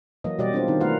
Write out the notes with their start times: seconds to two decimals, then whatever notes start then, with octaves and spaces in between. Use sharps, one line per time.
0.24 E3 F#3 A#3 D#5
0.39 B2 G3 G4 D5 D#5
0.53 C4 D4 E4 F4 G4 C5
0.68 D#3 C4 D#4
0.80 A3 F4 A#4 B4 F5 F#5